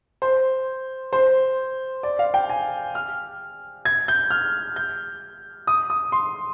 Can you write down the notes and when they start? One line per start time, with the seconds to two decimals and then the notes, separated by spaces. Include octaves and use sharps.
0.22 C5
1.13 C5
2.03 D5
2.19 F5
2.34 G5
2.50 G#5
2.95 F6
3.85 G#6
4.08 G6
4.31 F6
4.76 G6
5.67 D#6
5.90 D#6
6.12 C6